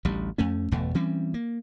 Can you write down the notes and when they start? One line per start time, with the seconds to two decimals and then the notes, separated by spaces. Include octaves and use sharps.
0.05 A1 D2 G3
0.38 F2 A3 C#4
0.71 G1 E2 B2 A3
0.95 E3 G3 C4 C#4
1.34 A#3